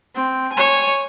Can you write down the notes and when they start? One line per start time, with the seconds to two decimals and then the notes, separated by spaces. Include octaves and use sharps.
0.15 C4
0.53 C#5 G#5